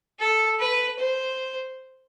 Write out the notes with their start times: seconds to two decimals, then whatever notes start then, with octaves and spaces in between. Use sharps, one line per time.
0.19 A4
0.59 B4
0.99 C5